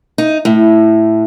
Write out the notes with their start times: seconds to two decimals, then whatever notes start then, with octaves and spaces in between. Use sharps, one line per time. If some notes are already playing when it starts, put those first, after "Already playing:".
0.18 D#4
0.45 A2